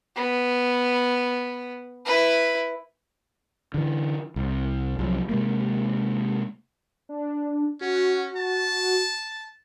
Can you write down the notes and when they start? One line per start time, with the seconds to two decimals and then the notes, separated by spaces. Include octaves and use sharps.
0.16 B3
2.05 E4 B4
3.74 D3 E3
4.36 C2
4.99 C2 F3 F#3
5.29 C3 G#3 A#3
7.09 D4
7.81 C#4 F#4
8.36 A5